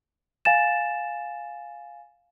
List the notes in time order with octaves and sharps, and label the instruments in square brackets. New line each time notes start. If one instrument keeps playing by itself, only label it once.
[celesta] F5 G#5 A6 E7